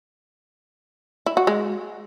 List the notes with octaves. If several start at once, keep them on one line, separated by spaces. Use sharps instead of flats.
E4
F#4
G#3